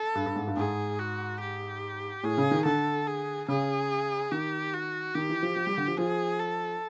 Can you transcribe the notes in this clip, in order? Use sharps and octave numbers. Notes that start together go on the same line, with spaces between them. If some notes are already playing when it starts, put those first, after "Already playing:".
Already playing: A4
G2
G2
G#2
G2
G#2 G#4
F#4
G4
A2 G#4
C#3
D#3
D3 A4
G#4
C#3 G#4
D#3 G4
F#4
D#3 G4
E3
F3
F3
G3
D3
F3
F3 G#4
A4